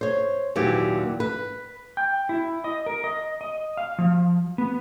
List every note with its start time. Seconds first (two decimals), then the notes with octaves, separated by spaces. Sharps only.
0.01 C5 C#5
0.56 D#2 A#2 E3 F#3 G4
1.20 B4
1.97 G5
2.29 E4
2.64 D#5
2.86 A#4
3.04 D#5
3.41 D#5
3.77 F5
3.98 F3
4.58 B3